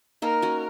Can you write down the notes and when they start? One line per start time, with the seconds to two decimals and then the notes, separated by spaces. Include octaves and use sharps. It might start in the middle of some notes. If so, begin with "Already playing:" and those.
0.22 A#3 D#4 A#4
0.42 C#4 F#4